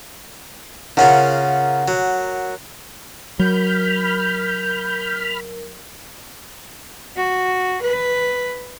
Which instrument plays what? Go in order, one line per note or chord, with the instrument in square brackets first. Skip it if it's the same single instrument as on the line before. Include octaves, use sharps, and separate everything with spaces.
[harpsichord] C#3 C#4 F4 [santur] A#4 F#5
[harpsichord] F#3
[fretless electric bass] F#3 [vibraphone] A#4 [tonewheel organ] B5 F6 [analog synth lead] G6
[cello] F#4
B4